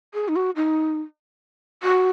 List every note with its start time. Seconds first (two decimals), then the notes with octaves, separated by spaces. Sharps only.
0.14 G#4
0.28 D#4
0.36 F#4
0.56 D#4
1.83 F#4